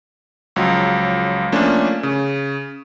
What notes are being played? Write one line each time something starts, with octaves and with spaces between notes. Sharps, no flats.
C#2 F3 F#3
F3 A3 A#3 C#4 D4
C#3